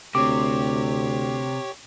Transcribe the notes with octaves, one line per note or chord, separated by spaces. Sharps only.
D2 C3 G4 C#5 D6